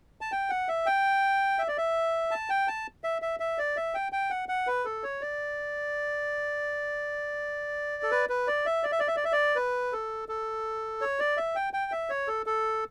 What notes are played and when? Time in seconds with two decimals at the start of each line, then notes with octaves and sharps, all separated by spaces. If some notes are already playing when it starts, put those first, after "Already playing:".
0.21 A5
0.32 G5
0.50 F#5
0.68 E5
0.86 G5
1.59 E5
1.68 D5
1.78 E5
2.31 A5
2.50 G5
2.68 A5
3.04 E5
3.22 E5
3.40 E5
3.58 D5
3.77 E5
3.94 G5
4.12 G5
4.30 F#5
4.49 F#5
4.67 B4
4.85 A4
5.03 C#5
5.21 D5
8.03 A4
8.11 B4
8.29 B4
8.47 D5
8.66 E5
8.83 D5
8.92 E5
9.00 D5
9.08 E5
9.16 D5
9.25 E5
9.32 D5
9.56 B4
9.93 A4
10.29 A4
11.01 C#5
11.20 D5
11.37 E5
11.55 G5
11.73 G5
11.92 E5
12.10 C#5
12.28 A4
12.46 A4